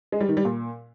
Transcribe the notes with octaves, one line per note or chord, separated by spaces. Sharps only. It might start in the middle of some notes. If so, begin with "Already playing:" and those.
G#3
G3
D#3
G3
A#2